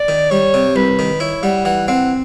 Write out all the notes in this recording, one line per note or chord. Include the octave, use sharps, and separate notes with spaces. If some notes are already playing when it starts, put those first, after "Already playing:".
Already playing: D5
D#3
G3 C#5
C3
C2 B4
D#3
E4 C#5
G3 F#5
E3 F#5
C4 F#5